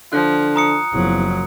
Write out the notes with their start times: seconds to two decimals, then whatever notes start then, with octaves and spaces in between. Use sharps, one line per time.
0.13 D3 F3 F#6
0.56 A#5 D#6 C#7
0.93 F#1 E2 F3 F#3